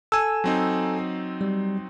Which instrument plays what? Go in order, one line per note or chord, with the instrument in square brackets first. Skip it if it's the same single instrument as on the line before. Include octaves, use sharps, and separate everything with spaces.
[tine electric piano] A4 G#5 [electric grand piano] E6
[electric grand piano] F#3 C4 D#4
[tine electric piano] G3